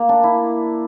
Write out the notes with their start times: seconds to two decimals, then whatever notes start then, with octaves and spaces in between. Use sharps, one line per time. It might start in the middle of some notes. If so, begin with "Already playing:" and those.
Already playing: A#3
0.09 D4
0.23 E4